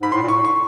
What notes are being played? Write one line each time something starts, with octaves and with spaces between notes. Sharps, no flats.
G#2 B5
A2 C6
A#2
A2 C#6
C#6